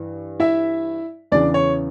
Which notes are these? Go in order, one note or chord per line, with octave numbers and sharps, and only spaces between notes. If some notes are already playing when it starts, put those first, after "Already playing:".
Already playing: G2 E3
E4 E5
E2 C#3 E3 D4 D5
C#5